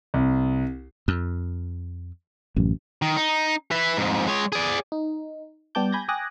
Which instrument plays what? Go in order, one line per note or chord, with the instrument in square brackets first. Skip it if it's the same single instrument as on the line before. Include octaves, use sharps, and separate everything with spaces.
[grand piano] C2
[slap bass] F2
[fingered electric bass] A1 F#2
[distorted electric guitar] D#3
D#4
B4 E5
F2 G#2
G#3 C#5
G#4 D5
[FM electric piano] D#4
G3 B3 G4 A5 D6 G6
G#5 B5 G6 G#6 A#6
G5 G#5 D6 D#6 F#6 A#6